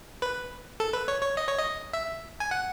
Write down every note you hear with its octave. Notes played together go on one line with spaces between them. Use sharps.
B4
A4
B4
C#5
C#5
D#5
C#5
D#5
E5
G#5
F#5